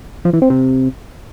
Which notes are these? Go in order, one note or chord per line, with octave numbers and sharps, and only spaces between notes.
F3
E3
C4
C3